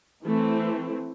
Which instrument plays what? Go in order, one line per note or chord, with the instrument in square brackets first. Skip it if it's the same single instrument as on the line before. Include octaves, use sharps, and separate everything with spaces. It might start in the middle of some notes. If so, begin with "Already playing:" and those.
[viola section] E3 A3 C4